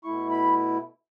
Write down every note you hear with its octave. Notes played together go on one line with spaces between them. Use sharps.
B2 A3 E4 C#6
B5